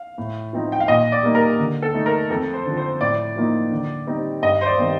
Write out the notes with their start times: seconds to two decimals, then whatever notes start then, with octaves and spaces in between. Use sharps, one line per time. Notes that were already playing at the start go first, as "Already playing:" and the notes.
Already playing: F5
0.18 A2
0.53 F3 C4 D#4
0.72 G5
0.80 F5
0.88 A#2 D#5
1.12 D5
1.23 G3 A#3 D#4
1.35 A#4
1.59 D3
1.82 A4
1.94 A3 D#4
2.06 A#4
2.30 F2 A4
2.53 C5
2.66 D3 F3
2.77 C5
3.00 A2 D5
3.36 F3 A#3 D#4
3.72 D3
4.07 G3 C4 D#4
4.42 G2 D#5
4.61 C5
4.66 D5
4.78 D#3 G3 C4